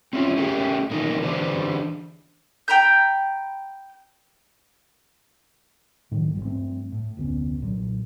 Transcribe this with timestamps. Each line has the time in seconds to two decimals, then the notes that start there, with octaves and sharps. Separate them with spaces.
0.13 C4 C#4 E4 F4
0.37 A3 C#4 G4 G#4 A#4
0.91 B2 E3 A#3 D#4 A#4
1.22 D3 E3 D4 B4 C5
2.68 G5 A#5 B5 G6
6.11 A2 D#3 E3 F#3
6.32 G1 G2
6.45 G2 F3 A3 C4
6.92 A2
7.17 F1 D2 B3 C#4
7.60 B1 A#2 F#3